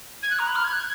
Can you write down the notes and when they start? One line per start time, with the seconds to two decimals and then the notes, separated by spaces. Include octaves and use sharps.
0.22 G#6
0.30 F#6
0.38 A#5
0.47 B5
0.55 F6
0.64 G#6
0.72 F#6
0.80 G#6